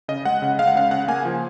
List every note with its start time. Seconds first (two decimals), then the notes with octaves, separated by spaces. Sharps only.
0.08 C#3 D#5
0.25 G#3 F#5
0.42 C#3
0.59 G#3 F5
0.68 F#5
0.75 C#3 F5
0.91 C#3 F#5
1.08 A#3 G#5
1.25 F3